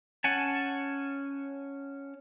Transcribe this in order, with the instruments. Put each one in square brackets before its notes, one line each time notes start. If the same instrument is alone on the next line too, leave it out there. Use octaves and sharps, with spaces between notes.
[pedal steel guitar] C#4 F#5 G#5 A5